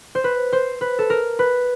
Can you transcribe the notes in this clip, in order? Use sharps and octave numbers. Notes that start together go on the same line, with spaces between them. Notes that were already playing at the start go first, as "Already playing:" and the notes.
C5
B4
C5
B4
A4
A#4
B4